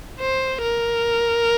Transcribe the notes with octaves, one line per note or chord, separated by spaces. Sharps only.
C5
A#4